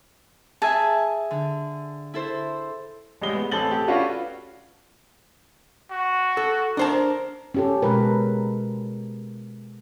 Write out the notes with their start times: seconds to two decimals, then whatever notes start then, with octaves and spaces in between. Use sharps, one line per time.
0.62 G#4 E5 G#5 A5
1.31 D3
2.14 E4 A4 C5
3.21 A1 G3 G#3 G7
3.34 B3
3.51 A1 C4 A4 A6 F#7 G7
3.71 G4 A4
3.88 C#4 D4 F4 F#4 B4
5.92 F#4
6.37 A4
6.77 D4 A#4 C5 A5
7.55 C#4 G4 A4
7.82 B2 G#3 A#4 B4